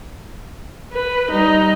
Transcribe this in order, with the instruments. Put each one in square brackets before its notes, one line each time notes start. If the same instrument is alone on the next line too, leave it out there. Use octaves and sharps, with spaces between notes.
[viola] B4
[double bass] G3 [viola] D#4